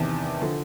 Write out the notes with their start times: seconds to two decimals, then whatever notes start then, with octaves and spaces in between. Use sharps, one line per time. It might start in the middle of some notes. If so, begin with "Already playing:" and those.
Already playing: E2 C3 D#3 A5
0.42 D3 F3